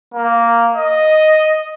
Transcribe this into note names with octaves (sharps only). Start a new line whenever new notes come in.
A#3
D#5